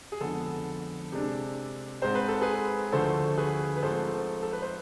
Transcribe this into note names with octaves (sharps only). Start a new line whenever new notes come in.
G#4
F2 D3 G#3 B3 A4
C3 G#3 D4
G#2 G#3 C4 C5
B4
A4
G#4 B4
D2 D3 F3 A3 A4 C5
G#4 B4
B4
G#2 F3 A3 C4 A4 C5
A4
B4
C5